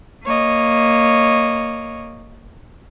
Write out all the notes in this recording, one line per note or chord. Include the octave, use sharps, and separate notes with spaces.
A#3 C#5 D#5